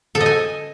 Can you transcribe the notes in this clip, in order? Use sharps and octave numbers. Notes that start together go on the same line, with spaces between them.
A4
D#5
G#5